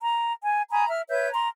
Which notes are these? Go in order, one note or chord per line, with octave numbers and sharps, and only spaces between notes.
A#5
G#5
G#5 A#5 B5 D#6
E5 F6
B4 C#5 E5 G6
A#5 C6